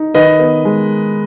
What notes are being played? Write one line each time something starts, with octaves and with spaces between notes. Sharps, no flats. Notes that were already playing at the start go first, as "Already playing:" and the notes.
Already playing: D#4
D#3 B4 D#5
B3
G#3